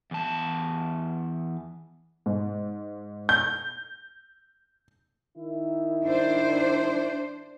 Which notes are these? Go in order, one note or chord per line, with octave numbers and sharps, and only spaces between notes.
E2 A5
G#2
G6
D#3 E4
D4 C5